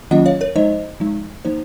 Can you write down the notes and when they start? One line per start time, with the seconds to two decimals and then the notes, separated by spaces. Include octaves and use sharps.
0.11 D#3 F#3 A#3 C#4 F4 D#5 F#5
0.26 C#5 F5
0.41 A#4 C#5
0.56 F3 G#3 D#4 C5 D#5
1.00 F3 G#3 D#4
1.45 F3 A#3 D#4 C5